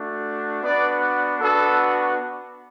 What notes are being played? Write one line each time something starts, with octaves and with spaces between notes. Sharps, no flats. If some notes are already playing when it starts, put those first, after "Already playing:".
Already playing: A3 D4 F#4
B3 D4 F#4 B4 D5
B3 D4 F#4 A4